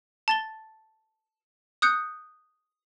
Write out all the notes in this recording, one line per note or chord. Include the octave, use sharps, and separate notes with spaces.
A5 A6 G7
D#6 F#6 G6 C#7